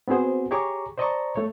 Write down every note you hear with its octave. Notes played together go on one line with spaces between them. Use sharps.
B3 C4 F#4 G#4 C5
G4 G#4 C#5 A#5 C#6 D6
C5 D5 D#5 A5 A#5 C#6
A3 C#5